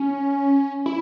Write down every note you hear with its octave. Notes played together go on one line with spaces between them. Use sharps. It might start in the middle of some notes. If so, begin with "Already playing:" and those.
Already playing: C#4
E4